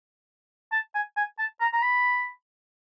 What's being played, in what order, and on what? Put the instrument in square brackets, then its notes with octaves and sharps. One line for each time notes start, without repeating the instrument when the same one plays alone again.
[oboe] A5
G#5
G#5
A5
A#5
A#5
B5